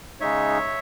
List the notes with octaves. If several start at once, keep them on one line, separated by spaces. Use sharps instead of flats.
C#3 G#3 D#4 C#5 E5